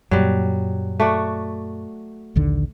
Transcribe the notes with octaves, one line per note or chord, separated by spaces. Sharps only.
F#2 A#2 F#3 G3
A3 F#4 D5
A#1 D#2 D3